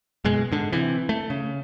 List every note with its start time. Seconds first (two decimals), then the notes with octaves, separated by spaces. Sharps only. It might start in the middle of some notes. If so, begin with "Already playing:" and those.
0.24 F#1 B2 G#3
0.52 G#2 D3
0.72 C3 E3
1.09 A3
1.30 C#3